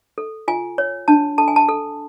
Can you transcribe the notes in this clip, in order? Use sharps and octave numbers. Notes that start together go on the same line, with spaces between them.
A4
F4 G#5
C#5
D4 A5
A4 A5
G#5
A5
A4